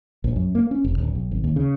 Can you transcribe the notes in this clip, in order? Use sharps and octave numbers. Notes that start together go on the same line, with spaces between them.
A#1
F#2
A#3
C#4
F1
D1
B1
G#1
D#2
C#3